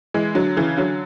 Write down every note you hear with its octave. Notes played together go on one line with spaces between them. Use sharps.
E3 G#3
D3 F#3
C#3 E3
D3 F#3